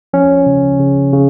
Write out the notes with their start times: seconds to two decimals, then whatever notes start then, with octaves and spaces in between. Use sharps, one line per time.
0.13 F3 C#4
0.46 C#3
0.79 C#3
1.13 C#3